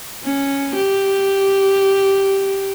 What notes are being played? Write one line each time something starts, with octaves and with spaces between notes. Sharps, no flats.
C#4
G4